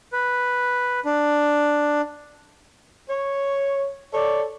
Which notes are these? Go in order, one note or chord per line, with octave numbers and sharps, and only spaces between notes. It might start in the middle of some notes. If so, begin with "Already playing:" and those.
B4
D4
C#5
A4 C#5 D5